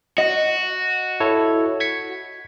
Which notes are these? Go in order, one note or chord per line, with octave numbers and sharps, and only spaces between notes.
F#4 D#5
E4 A4 C#5
G#6 B6 C#7